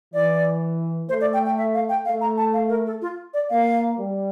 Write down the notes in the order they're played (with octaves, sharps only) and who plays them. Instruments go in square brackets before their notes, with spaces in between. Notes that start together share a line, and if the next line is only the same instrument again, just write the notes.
[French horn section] E3 [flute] D5
[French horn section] A3 [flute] C5
[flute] D5
G5
G5
E5
F5
G5
[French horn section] A3 [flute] F5
[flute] A#5
A5
F5
A#4
A4
F4
D5
[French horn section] A#3 [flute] F5
[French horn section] G3